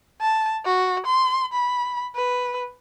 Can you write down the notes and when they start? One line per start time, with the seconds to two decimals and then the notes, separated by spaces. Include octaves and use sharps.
0.21 A5
0.65 F#4
1.07 C6
1.53 B5
2.16 B4